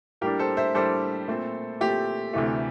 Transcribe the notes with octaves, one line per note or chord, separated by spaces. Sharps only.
A2 G3 A#3 D4 G4 A#4
A4 C5
C5 E5
A2 G3 A#3 D4 A4 C5
A#2 A3 C4
A#2 A3 C4 G4
D2 C3 E3 A3